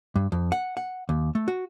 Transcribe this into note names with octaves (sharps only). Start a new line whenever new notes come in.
G2
F2
F#5
F#5
D#2
A3
F#4